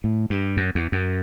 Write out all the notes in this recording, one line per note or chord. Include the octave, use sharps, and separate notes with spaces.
A2
G2
F#2
E2
F#2